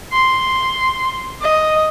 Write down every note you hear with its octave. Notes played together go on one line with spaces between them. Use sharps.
C6
D#5